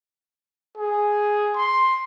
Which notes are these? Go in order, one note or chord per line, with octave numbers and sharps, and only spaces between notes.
G#4
C6